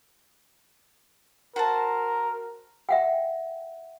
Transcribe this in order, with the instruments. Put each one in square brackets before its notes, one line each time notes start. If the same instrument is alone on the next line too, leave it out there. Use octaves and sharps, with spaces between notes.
[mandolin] F#4 C5 A5 [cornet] A#4
[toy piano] E5 F#5 G5